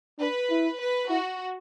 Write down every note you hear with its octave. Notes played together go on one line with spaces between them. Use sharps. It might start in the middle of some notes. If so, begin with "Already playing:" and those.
D4 B4
E4
B4
E4 F#4